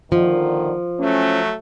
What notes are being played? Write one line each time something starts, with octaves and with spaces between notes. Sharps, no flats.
A#2 D3 D#3 F3
F#3 A3 C#4